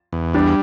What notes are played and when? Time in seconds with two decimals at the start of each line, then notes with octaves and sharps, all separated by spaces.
0.13 E2
0.34 G3 D4